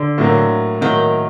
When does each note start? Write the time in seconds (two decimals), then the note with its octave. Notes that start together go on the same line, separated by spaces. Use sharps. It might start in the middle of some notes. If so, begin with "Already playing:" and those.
Already playing: D3
0.18 A2 F#3 A#3
0.81 A2 D#3 F#3 A#3